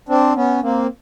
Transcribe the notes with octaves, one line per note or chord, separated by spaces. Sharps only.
C4 D4
B3 C#4
A#3 C4